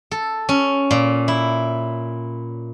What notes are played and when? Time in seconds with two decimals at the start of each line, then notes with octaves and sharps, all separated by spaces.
0.11 A4
0.49 C#4
0.91 A#2
1.28 E4